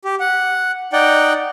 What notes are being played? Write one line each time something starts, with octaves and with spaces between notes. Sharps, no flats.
G4
F#5
D#4 D5 F#5 G5